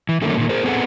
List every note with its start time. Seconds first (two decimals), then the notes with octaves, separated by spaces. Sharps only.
0.09 E3
0.22 D3 D#3 G3 A3 A#3 C#4
0.37 A#2 D#3
0.49 G#4 A#4 C5
0.64 B3 C4 G#4 A4 B4 F#5